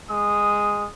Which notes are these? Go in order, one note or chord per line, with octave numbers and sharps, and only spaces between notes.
G#3 D#6